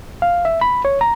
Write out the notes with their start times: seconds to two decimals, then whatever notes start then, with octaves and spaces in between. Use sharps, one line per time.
0.22 F5
0.45 E5
0.61 B5
0.85 C#5
1.01 A#5